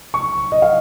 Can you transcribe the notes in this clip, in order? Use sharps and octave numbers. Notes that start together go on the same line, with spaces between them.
C#6
D#5
F5